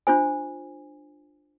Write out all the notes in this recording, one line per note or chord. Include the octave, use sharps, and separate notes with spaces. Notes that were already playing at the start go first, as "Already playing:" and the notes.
D4 F4 C5 G#5